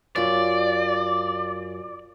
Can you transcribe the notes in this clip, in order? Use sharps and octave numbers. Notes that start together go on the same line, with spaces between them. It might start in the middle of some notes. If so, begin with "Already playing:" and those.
F#2 F4 D5